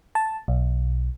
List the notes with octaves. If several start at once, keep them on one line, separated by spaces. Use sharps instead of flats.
A5
B1